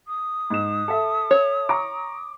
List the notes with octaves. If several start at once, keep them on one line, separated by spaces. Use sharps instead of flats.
D#6
G#2 E7
A4 E5
C#5
A#5 C#6 D6